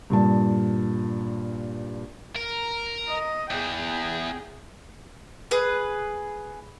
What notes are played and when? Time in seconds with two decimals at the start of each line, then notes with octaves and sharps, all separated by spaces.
0.10 G2 A#2 A5
2.36 A#4
3.08 D#5
3.51 E2 G#4 G5
5.51 G#4 B4